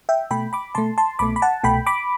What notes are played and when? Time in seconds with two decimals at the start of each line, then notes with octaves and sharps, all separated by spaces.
0.09 E5 G5
0.31 B2 A3 G5 B5
0.53 B5 D6
0.75 B2 A3 A5 C6
0.98 A5 C6
1.19 C2 B2 A3 B5 D6
1.36 B5
1.42 F#5 A5
1.64 C2 B2 A3 G5 B5
1.86 B5 D6